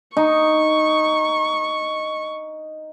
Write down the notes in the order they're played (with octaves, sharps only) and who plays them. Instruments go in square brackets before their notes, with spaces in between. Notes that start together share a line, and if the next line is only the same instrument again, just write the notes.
[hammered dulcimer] D#4 [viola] C#6